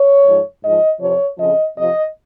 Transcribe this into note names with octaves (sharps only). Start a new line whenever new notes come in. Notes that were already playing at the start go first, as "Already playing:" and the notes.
Already playing: C#5
G#2 F3
G#2 D#5
F3
F2 C3 F3 C#5
F2 C#3 F3 D#5
F2 C3 F3 D#5